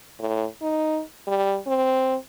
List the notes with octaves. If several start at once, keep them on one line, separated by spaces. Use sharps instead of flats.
A2
D#4
G3
C4